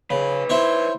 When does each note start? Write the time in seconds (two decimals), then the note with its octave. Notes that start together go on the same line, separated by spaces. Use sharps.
0.10 C#3 D#4 B4
0.50 E4 C5 C#5